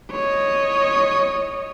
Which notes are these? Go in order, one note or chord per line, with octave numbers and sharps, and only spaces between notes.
C#5 D#5